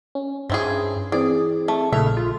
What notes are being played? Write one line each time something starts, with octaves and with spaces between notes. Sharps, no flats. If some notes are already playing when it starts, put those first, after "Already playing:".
C#4
G2 C4 E4 G#4
E3 C4 G#4 D5
A3
A#1 C#3 A3 E5 F6
F4